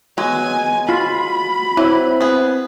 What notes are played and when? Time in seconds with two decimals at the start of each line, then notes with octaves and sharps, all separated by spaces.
0.18 F#3 G#3 B3 G#5
0.89 F4 F#4 B5
1.77 F#3 C4 E4
2.21 B3 G#4